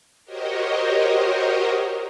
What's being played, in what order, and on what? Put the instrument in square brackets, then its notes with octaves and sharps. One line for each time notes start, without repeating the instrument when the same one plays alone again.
[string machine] F#4 G4 A#4 C5 C#5 D#5